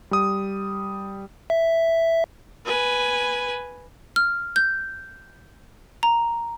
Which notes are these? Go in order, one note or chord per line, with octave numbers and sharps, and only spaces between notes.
G3 D#6
E5
B4 G#5
F6
G6
A#5